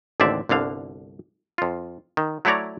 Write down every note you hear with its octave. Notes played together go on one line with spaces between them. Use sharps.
A1 D#2 D3 C4 D5 E5
G1 C2 D3 F5
F2 F4
D#3
F#3 A3 E4 C#5 D5 A#5